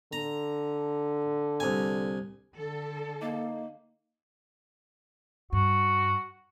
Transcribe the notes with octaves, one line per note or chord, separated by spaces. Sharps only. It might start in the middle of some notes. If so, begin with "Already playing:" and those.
D3 A#5
C2 G#5
D3 A4
A#3 D#4
G2 F#4